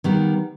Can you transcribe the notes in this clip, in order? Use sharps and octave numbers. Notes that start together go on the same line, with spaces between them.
D#3 G3 B3